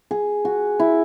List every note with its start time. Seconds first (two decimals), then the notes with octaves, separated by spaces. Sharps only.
0.11 G#4
0.45 F#4
0.80 E4